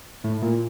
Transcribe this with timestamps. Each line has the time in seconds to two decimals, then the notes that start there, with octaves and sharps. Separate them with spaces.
0.24 A2
0.42 A#2